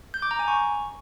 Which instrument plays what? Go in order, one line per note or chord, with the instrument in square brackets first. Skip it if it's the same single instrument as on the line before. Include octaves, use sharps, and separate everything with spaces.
[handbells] G6
D6
A#5
G#5
C#6